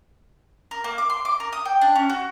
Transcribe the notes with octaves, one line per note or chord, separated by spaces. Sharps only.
A#4
A#3
D6
C6
D6
A#4
D#6
G5
D4
C#4
F#4